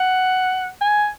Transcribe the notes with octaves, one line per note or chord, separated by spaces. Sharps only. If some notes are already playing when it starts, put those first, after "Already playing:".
Already playing: F#5
G#5